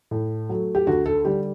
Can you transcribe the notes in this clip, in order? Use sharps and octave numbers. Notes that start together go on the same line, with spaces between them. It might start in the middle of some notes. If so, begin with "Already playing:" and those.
A2
F#3 A3
G4
D2 F#4
A4
D3 G3 G4